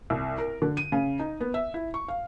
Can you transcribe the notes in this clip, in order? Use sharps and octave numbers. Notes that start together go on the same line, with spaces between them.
C2
A#4
D3
D#7
C#3
D#4
B3
E5
E4
C#6
F5